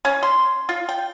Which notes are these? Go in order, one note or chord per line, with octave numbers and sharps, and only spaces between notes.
C#4
C6
F4
G5